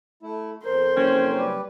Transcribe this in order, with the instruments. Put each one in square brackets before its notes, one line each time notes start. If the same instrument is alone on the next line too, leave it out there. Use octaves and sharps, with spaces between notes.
[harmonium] A3 E4
[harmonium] F2 A#4 [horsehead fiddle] C5
[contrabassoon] F#1 [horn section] C4 C#4
[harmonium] G3 G4 B4